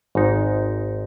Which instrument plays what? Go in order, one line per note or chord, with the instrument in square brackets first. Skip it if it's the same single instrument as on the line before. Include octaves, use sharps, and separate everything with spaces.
[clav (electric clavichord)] G#1 G#2 G#3 D#4 G#4